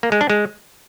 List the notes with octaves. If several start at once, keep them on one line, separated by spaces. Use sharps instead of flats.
A#3
G#3
D4
G#3